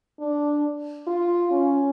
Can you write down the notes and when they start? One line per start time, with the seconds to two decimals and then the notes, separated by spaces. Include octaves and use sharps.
0.20 D4
1.07 F4
1.52 C#4